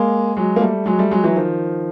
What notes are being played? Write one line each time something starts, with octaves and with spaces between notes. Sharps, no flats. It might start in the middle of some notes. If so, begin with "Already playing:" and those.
Already playing: G#3 A#3
F#3 G#3
A#3
G3 A3
F#3 G#3
G3 A3
F#3 G#3
E3 F#3
D#3 F3